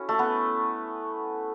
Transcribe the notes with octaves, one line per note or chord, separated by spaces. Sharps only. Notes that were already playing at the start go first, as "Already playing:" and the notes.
Already playing: C#4 E4 F#4 A4
A3
B3